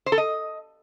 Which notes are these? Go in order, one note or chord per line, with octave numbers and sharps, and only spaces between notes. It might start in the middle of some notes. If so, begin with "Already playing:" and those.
C5
A4
D#5